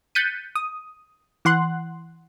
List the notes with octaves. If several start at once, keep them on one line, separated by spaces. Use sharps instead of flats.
F#6 G6 A6 B6 C#7 D#7
D#6
E3 F#5 C6 F#6